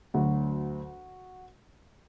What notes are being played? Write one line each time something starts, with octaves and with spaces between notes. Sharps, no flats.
D2 D3 F#3 F#4